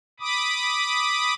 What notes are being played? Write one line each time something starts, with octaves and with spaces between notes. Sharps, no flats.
B5 D6 D#6